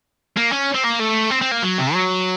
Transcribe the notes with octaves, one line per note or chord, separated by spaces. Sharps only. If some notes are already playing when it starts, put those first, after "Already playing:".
A#3
C#4
C4
A#3
A3
C4
C4
A#3
F#3
C3
F#3